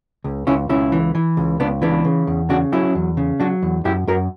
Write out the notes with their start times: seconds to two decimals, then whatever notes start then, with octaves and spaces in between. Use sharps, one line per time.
0.24 C#2
0.47 C#2 C#4 E4
0.69 C#2 C#4 E4
0.92 E3
1.15 E3
1.37 C#2
1.60 C#2 B3 D4
1.82 E3 B3 D4
2.05 C#3
2.27 E2
2.49 C#3 D4 F#4
2.72 F#3 C#4 E4
2.95 E2
3.17 C#3
3.40 F#3 D4 F#4
3.62 E2
3.85 F#2 E4 G4
4.07 F#2 F#4 A#4